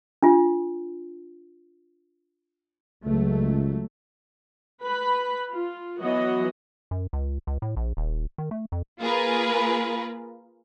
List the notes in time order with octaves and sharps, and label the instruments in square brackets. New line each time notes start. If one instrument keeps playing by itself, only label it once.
[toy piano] D4 F4
[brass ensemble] C#2 [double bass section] F#3 A3
[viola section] B4 B5
F4
E3 F#3 B3 F#4 D#5
[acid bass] F#2
C#2
C#2
A2
A#1
D#1
D#3
A3
F2
[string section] A#3 F4 G#4 A#4 B4